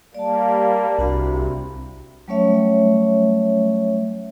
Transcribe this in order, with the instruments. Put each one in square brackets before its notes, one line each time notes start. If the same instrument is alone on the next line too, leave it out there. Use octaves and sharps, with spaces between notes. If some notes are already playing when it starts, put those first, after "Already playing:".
[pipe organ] G3 A#3 [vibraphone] D5 A5
[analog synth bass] C2 [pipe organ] C3 [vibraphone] D4 F#4 B5
[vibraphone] F#3 G3 A3 C#4 C#5 E5